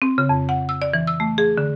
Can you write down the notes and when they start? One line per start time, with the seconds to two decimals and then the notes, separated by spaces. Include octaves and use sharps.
0.02 C4
0.18 C#3
0.29 F2
0.49 F#5
0.69 E6
0.82 D5
0.94 E3
1.07 E6
1.20 A3
1.38 G#4
1.58 D3